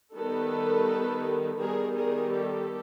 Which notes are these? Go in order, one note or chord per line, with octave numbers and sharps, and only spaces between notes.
D#3 G3 B3 A4 B4
D#3 G3 B3 G#4 A#4
G#4 A#4
G4 A4